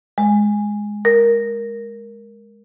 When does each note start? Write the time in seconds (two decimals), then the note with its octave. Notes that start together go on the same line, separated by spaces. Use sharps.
0.18 G#3
1.05 A#4